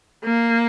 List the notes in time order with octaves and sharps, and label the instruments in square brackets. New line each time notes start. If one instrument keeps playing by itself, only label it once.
[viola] A#3